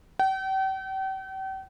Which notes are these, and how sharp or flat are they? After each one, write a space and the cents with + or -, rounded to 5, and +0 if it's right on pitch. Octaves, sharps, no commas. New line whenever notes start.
G5 -40